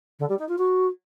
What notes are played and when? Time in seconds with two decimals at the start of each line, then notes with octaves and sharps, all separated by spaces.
0.19 D3
0.29 G3
0.38 D#4
0.48 F4
0.58 F#4